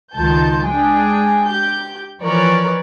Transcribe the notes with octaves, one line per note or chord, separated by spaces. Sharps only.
C#2 D#3 F4 A5 G6
G#3 D4 G#4 G5
G4 G6
E3 F3 A#4 B4 C#5 D5